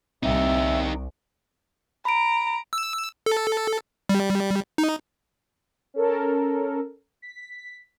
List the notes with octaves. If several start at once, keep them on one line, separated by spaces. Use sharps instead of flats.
C2 C4 D#4 G4 E5
A#5 B5 D7
E6
A4
G3
D#4
C#4 A4 A#4
B6